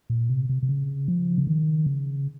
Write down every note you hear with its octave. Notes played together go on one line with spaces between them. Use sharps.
A#2
C3
C3
C3
C#3
F3
C#3
D#3
C#3